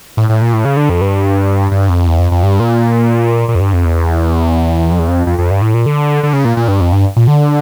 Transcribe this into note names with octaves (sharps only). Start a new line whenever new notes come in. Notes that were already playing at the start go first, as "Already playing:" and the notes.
A2
A2
A#2
A2
C#3
D3
F2
G2
G2
F2
E2
F2
F2
G2
A#2
A#2
F2
G2
F2
E2
F2
E2
F2
F2
F2
G2
A2
A#2
D3
D3
C#3
A#2
A#2
G2
F2
G2
A#2
D3